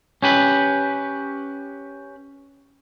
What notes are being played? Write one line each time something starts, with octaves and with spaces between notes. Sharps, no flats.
C#4 G4 B4